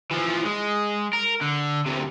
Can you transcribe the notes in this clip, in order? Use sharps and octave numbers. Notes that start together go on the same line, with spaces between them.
E3 F3
G#3
A#4
D3
D2 C3